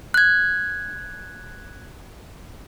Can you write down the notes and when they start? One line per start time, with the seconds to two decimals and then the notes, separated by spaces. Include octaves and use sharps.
0.14 F#6 G#6